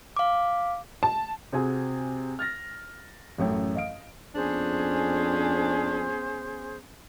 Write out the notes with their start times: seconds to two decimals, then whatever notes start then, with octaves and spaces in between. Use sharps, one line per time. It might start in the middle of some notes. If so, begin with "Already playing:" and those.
0.16 F5 D6
1.03 A5
1.53 C3 C4 F#4 G#4 G#5
2.39 F6 A6 A#6
3.38 A1 F#2 A3 C#5 G5
3.75 D#5 F5 D7
4.35 F2 B3 C#4 D4 G#4 C5